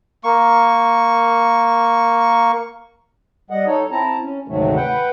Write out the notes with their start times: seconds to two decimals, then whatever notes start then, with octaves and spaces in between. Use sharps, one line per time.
0.24 A#3 C#6
3.50 G3 D#5 F#5
3.66 D#4 A4 C#5
3.91 C4 E4 A5 A#5
4.22 C#4
4.48 D2 G#2 C3 D#3 F#3 A3
4.76 B4 F#5 G5